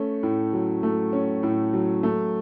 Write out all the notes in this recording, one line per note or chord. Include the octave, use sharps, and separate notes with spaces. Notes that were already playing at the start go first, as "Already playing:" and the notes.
Already playing: A3 C#4
A2
F#3
A3
C#4
A2
F#3
A3